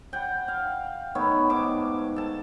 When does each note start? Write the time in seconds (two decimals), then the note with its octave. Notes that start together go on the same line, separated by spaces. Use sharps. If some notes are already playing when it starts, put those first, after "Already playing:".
0.13 F#5 G5
0.48 F5
1.15 D#3 A3 B3 C#5
1.50 G#2 A5 D6
2.16 A4 A5